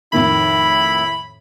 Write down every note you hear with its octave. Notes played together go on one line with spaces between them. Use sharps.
F2 A2 D#3 E4 B5